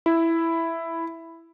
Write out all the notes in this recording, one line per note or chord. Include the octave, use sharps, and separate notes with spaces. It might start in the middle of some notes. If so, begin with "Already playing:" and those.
E4